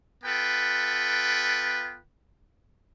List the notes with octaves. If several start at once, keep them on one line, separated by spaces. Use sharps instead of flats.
B3 F4 A4 B4 G5